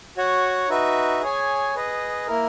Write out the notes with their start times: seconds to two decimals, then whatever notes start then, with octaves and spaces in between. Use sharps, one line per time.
0.17 F#4 C#5 F#5
0.69 D#4 F#4 B4 E5
1.21 G#4 C#5 G#5
1.75 G#4 B4 D#5
2.27 A#3 E4 A#4